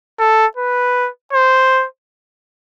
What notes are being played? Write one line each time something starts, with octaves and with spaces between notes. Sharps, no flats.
A4
B4
C5